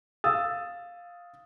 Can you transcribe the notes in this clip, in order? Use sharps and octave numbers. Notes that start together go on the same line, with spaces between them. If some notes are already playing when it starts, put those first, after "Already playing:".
F5 D#6 E6 A6